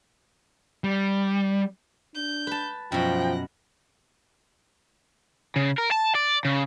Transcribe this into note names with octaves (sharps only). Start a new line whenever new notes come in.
G3
D4 G6
B4 A5
F#2 B2 F3 G5 F#6 A#6
C#3
A#4
A5
D5
C#3